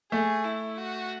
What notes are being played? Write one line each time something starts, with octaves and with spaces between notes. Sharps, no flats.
A3 G#4
E4
F#4